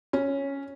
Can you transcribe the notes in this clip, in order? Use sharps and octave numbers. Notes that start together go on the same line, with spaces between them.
C#4